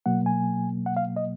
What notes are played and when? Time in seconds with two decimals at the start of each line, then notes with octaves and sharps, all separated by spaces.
0.06 B2 F#3 A#3 F#5
0.26 G#5
0.86 F#5
0.97 F5
1.16 D#5